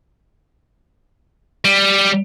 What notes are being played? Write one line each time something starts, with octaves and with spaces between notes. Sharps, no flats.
G3